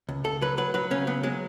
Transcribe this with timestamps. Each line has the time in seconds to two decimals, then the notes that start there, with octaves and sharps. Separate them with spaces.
0.09 C#2
0.24 C#2 A4
0.41 F#3 B4
0.58 F#3 B4
0.74 F#3 B4
0.91 C#3 C#4
1.07 F#3 B3
1.23 F#3 G#3